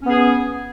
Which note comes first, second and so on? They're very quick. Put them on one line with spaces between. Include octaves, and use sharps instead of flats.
C#4 B3 G#4